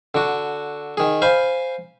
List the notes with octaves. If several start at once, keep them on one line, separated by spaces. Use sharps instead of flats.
D3 F#4
D#3 G#4
C5 F5 G#5 B5